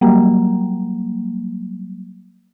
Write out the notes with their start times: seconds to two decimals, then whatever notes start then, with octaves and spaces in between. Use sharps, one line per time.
0.01 F#3 G3 A#3